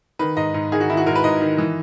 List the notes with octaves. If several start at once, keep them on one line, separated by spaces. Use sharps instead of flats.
D#3 B4
G#2 D#5
G#2
D#3 G#4
F#4
D#3 E4
F#4
G#2 A#4
B4
G#2 D#5
D#3
E3